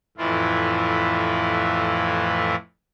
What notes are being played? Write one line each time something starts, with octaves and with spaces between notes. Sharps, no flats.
F2 A2 E3 E4 F4